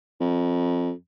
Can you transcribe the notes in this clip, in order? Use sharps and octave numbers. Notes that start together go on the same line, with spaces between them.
F2